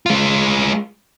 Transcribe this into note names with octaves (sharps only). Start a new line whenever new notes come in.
G#3 F4